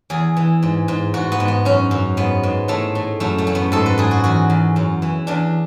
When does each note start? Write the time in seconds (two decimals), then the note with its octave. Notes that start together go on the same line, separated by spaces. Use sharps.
0.10 E2 G#4
0.37 E3
0.63 G#2
0.88 G#2
1.14 G#2 F#4
1.32 B3
1.40 G#2
1.48 B3
1.65 F#2 C#4
1.91 F#2
2.17 G#2 B3
2.43 G#2
2.68 A2 A3
2.95 A2
3.20 F#2 A3
3.38 A3
3.47 F#2
3.55 B3
3.72 G#2 A4
3.86 B4
3.98 G#2 G#4
4.11 F#4
4.24 E2 F#4
4.50 E2
4.76 F#2
5.02 E3
5.27 E2 D4